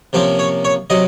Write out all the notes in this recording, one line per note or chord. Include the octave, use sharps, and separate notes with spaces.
C3 F3 A#3 C#4 C5
C#5
C#5
C3 F#3 C4 D#5